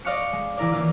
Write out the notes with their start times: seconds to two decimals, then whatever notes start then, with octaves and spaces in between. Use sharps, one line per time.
0.05 D5 D#5 F5 C#6 F#6 C#7
0.33 G#3
0.57 E3 E4 A#4 D5
0.72 E3 A#3 C#4 F4